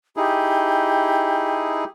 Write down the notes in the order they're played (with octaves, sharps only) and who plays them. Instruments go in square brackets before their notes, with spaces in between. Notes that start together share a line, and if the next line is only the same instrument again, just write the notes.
[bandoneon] D#4 E4 G#4 [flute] G4